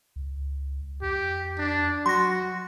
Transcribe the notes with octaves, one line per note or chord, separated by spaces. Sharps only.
C#2
F2 G4
D4
F#3 F#4 C6 A#6